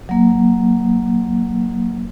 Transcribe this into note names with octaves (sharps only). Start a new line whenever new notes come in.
F#3 A#3